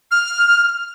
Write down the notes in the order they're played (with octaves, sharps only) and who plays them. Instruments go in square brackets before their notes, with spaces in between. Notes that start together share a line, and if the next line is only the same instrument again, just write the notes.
[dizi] F6